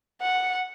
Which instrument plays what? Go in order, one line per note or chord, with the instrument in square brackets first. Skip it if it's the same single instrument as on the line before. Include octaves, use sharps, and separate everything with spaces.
[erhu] F#5